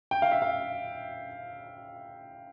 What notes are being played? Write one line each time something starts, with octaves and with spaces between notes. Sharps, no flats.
G5
F5
E5
F5